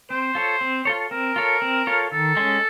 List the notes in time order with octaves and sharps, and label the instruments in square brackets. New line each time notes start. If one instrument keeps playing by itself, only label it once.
[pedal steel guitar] C4 [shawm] C5
[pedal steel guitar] F4 A4 C#5
C4
F4 A4 C#5
[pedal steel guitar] C4 [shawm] A#4
[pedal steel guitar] F4 A4 C#5
C4
F4 A4 C#5
[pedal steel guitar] D#3 [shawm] A4
[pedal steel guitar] G#3 C#4